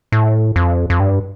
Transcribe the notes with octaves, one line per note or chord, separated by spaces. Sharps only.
A2
F2
F2
G2